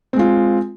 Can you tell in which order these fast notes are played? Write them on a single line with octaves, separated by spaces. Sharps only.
C4 G#3 F4